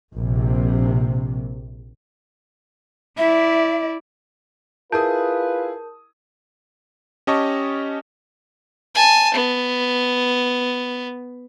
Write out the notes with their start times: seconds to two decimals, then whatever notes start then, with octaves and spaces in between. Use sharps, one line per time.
0.13 A#1 C3
3.18 E4 D5 E5
4.92 E4 F4 G#4 A#4 B4 A5 D#6 G6
7.27 C#4 G4 D#5 A5 C#6
8.95 G#5 A5
9.34 B3